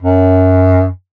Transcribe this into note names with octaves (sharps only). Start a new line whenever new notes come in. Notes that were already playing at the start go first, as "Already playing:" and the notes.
F#2